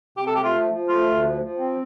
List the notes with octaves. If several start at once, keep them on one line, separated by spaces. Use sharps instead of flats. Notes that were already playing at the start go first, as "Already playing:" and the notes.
C3 G4
A4
A3 G4
F4
F3
F3
A3 F4
D2
F3
F3
C4